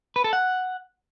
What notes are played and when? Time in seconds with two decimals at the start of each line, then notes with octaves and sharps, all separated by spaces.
0.16 B4
0.24 A4
0.33 F#5